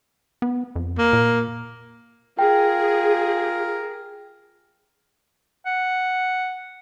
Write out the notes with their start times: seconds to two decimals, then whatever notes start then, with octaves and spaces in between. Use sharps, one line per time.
0.42 B3
0.76 F2
0.98 A#3
1.13 A#2
2.39 F4 G#4 A#4 G5
5.66 F#5